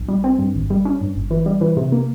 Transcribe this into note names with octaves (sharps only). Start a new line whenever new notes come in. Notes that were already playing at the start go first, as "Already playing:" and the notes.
Already playing: A#1
G3
C4
G2
G#1
G3
C#4
G2
G1
E3
G3
E3
C3
A#3